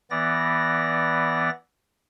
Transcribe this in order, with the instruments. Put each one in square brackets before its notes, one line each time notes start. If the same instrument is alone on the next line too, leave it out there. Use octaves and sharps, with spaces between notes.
[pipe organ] E3 B3 D5 A#6